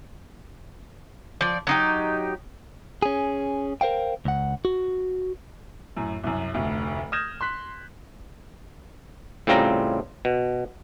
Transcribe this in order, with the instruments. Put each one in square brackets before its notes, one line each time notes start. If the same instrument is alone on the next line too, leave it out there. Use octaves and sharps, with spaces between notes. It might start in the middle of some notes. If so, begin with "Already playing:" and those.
[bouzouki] F3 D5
F#3 D#4 G4
[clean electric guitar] C#4 G#4
A#4 C5 F5 G5
C#2 F#5
F#4
[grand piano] F#2 A2
C2 F#2
F1 D2
D#6 F6 G6 G#6 A#6 E7
C6 F#6 B6
[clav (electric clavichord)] A2 C#3 G3 C4 F4 A#5
B2